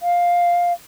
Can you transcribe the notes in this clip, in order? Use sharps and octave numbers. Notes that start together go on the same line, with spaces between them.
F5